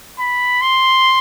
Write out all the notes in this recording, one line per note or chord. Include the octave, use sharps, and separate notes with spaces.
B5
C6